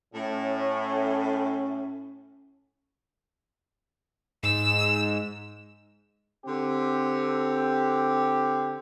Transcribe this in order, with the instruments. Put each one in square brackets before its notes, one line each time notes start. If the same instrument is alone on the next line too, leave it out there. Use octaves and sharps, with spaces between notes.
[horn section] A2 [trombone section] C#4
[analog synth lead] G#2 [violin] E6
[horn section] D3 C4 G4